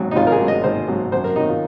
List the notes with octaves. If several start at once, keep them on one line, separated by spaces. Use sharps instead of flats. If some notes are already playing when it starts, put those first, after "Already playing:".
Already playing: G#1 G#2 F#3
D#4
G#1 F4
A#4
G#4
G#2 F#3
D#5
G#1 C5
G#2 F#3
F#2 C5
A#4
D#3 F#3 D#4
F4